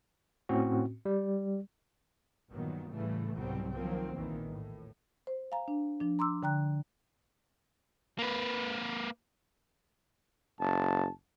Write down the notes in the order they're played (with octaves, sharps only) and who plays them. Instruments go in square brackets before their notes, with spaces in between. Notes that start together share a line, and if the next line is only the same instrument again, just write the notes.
[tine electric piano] A2 C4 C#4 F#4
G3
[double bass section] G1 A#2 D#3 F#3 B3
A2 C#3 E3 G3 A3
C2 G#2 B2 F#3 G3 C4
D#3 F3 F#3 A#3 C4
A#1 E2 A#2 D#3 E3
A2
[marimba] C5
F5 G#5 A#5
D4
F3 D4
A#5 C6 D6 E6
D3 G5 A#5 F#6
[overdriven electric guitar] A#3 B4
[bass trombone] F#1 [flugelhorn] A5